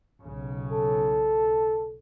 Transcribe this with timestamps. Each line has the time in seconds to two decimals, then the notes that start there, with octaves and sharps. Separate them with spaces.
0.23 B1 C#3
0.72 A4